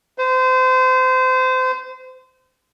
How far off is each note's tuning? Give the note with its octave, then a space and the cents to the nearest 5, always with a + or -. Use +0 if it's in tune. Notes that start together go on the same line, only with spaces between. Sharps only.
C5 -30